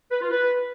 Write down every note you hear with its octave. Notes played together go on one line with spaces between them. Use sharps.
B4
F4
B4